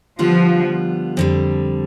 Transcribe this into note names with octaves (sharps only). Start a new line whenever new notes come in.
D3 F3 G3 B3 F4
F2 D3 G3